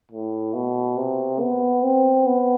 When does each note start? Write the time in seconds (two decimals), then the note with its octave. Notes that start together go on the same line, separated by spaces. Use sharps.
0.11 A2
0.54 B2
0.97 C3
1.41 B3
1.84 C4
2.26 B3